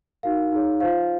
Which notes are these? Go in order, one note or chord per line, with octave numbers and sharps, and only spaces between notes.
D#4 F#4 A#4 F5
D#4 G#4 C#5
F4 C5 F5